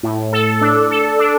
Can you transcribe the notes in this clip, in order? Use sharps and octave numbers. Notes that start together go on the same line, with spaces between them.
A2
A4
D4
A4
D4